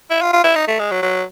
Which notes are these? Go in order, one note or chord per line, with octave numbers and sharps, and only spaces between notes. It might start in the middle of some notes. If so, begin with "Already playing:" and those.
E4
F4
F4
E4
D#4
A3
G#3
F#3
F#3